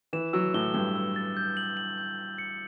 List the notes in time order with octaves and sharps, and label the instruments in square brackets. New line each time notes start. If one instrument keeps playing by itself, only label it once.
[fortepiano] E3 [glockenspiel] E7
[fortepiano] F#3 [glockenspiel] E6
[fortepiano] A2 [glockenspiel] G7
[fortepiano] G2 [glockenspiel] G7
[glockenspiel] E6
A6
G6
F#7
F#7
G6
G6
C#7